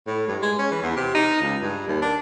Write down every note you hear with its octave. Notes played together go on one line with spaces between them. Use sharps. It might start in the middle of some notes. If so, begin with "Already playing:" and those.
A2
G2
G#3
C#4
E3
E2
C3
D#4
C#2
G2
D#2
D4